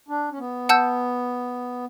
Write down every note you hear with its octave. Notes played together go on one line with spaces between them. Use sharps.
D4
C#4
B3
F#5 A5 E6 G6